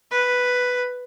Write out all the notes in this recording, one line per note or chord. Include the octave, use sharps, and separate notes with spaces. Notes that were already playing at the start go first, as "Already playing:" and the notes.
B4